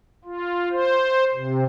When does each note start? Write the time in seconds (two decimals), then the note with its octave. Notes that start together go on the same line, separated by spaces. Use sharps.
0.25 F4
0.71 C5
1.34 C3